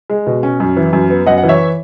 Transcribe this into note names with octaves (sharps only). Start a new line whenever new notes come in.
G#3
B2
C#4
F#2
E3
F#2
B3
F#2 D#5 F#5
F#5
E3
C#5 E5